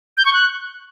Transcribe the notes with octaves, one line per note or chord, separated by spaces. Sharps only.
G6
C#6
F#6